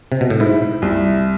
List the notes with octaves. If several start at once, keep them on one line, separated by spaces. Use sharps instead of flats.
C3
B2
A2
G#2 E4
C2